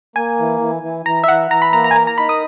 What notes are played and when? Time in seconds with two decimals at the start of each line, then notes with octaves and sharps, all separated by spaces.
0.16 A#3 G#5
0.39 E3
0.61 E3
0.83 E3
1.06 E3 A#5
1.24 E5
1.28 E3 F#5
1.51 E3 A#5
1.62 B5
1.73 A#3 A#5
1.84 A#5
1.91 G#5
1.95 A#4 A#5
2.07 A#5
2.18 D#4 B5
2.29 D#6